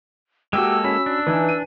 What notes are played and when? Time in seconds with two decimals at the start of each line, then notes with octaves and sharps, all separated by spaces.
0.53 G#3 A#3 F#4 G4 A4 G5 E6
0.84 C#4 F#4 B5 B6
1.06 D4
1.27 E3 D#4 E4 B4 G#5 A5
1.49 D#7